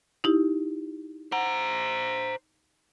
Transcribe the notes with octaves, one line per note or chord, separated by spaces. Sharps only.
D#4 E4 G4
C5 F#5 A#5